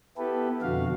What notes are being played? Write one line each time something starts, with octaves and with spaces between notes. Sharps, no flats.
B3 E4 G4 A4 B4
F2 B2 D3 F#4 F5